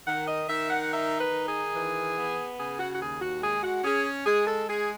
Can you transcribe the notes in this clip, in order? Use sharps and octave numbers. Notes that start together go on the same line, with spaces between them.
D#3 F#5
D#5
D#3 E5
F#5
D#4 E5
B4
D#3
G#4
E3
B3
C#3 G#4
F#4
F#4
D#2 G#4
F#4
G#3 G#4
F#4
C#4 G#4
G#3 G#4
A4
G#3 G#4